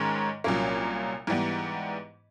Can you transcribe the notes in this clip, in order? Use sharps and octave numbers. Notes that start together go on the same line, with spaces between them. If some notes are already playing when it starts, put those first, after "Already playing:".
Already playing: G#2 D#3 G#3 C#4
C2 A#2 F#3 A#3 C#4
G#2 E3 G3 B3